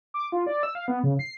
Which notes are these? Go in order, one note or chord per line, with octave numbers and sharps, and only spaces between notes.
D6
F4
D5
E6
F5
B3
C#3
C7